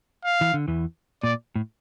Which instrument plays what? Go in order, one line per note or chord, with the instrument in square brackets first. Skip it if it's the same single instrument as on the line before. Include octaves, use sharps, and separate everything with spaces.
[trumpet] F5
[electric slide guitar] E3
D3
E2 E3
[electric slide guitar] A#2 [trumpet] D5
[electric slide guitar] A2